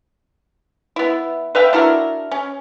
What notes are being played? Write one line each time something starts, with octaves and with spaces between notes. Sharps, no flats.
B3 E4
B4 E5 F5 G5
D4 E4 F#4 A#4
C#4